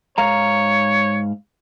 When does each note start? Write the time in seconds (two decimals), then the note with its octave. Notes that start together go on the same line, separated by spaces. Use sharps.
0.18 G#2 C#5 F5 A#5